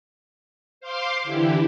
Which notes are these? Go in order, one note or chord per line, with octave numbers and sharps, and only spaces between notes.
C5 F5 C6 D6
D3 E3 E4 G4